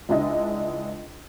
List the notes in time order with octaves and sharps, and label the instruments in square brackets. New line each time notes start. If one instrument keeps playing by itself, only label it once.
[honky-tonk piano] C#2 G#3 D4 E4 D#5